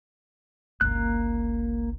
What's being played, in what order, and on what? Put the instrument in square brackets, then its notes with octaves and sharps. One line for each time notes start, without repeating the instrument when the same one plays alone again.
[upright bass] G1 C#2 [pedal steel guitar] A#3 F#6